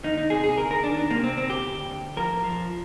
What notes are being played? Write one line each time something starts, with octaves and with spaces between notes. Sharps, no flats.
D#3 D#4
D#4
C3 G#4
G#4
D2 A#4
A#4
D#3 D4
D4
C3 A#3
C4
D2 C4
G4
D2
D2
F3 A#4
F3